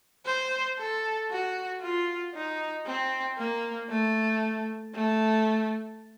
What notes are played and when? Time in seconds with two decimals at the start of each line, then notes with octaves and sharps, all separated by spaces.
0.26 C5
0.79 A4
1.30 F#4
1.81 F4
2.34 D#4
2.86 C4
3.38 A#3
3.89 A3
4.94 A3